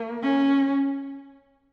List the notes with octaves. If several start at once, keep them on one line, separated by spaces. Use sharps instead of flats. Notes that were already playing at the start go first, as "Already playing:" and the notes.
Already playing: A#3
C#4